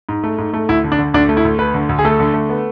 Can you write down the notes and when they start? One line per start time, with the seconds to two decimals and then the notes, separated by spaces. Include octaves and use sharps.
0.09 G#2
0.24 A3
0.38 G#2
0.53 A3
0.69 D2 E4
0.84 D3
0.92 D4
0.99 D3
1.14 D2 D4
1.29 A3
1.37 E4
1.45 D2
1.59 A3 B4
1.74 D3
1.89 D2
1.99 G#4
2.05 A3 A4
2.20 D3
2.34 A3
2.49 B3